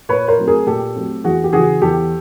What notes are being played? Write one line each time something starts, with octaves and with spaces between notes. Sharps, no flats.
A#2 B4 C#5
A#4 C5
F#3 A3 C4
G#4 A#4
A#2 G4 A4
F#3 A3 C4
E2 F#4 G#4
G4
C#3 E3 F#4 G#4
E2 G4 A4